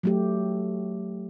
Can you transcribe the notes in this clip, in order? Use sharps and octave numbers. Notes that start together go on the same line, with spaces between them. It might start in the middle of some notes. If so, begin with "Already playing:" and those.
F#3 A3 G4